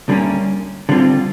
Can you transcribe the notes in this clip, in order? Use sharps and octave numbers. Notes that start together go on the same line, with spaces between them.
D2 D3 G3 A#3 C#4
D3 G3 C4 F4